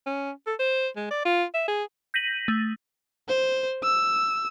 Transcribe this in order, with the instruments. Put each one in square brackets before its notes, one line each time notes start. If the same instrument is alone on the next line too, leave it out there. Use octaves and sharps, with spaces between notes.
[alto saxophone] C#4
A4
C5
G#3
D5
F4
E5
G#4
[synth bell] G6 A#6 B6 D#7 F#7
A3
[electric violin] C5
E6